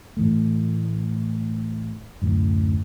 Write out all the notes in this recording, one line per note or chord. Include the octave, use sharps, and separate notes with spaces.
A2 E3 A3
D1 F#2 A2